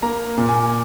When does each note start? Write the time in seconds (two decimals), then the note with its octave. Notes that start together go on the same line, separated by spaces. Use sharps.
0.02 A#3 A#5
0.37 A#2
0.49 G#5